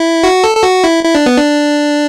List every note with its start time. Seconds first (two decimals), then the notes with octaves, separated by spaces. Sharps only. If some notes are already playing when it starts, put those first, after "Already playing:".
Already playing: E4
0.23 F#4
0.44 A4
0.56 A4
0.64 F#4
0.84 E4
1.04 E4
1.15 D4
1.26 B3
1.38 D4